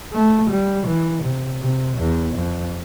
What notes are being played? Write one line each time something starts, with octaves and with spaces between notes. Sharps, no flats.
A3
G3
E3
C3
C3
E2
F2